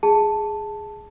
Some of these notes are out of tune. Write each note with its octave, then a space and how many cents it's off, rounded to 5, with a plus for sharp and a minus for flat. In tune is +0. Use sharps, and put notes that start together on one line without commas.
G#4 +0 A5 +0